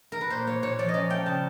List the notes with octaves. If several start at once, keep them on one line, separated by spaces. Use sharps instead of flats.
A#4
B4
A#2 C5
A#3 C#5
A#2 C#5
F3 D5
D#5
C#4 D5
A3 G5
C#3 A5